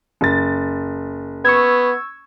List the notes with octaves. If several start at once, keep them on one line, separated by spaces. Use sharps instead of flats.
F#1 A6
B3 C#6 E6 G#6